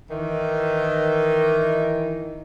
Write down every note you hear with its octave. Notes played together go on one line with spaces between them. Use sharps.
D#3 E3